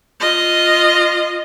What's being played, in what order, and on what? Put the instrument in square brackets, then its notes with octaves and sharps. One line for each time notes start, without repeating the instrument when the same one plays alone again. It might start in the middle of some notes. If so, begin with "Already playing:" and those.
[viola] F4 D#5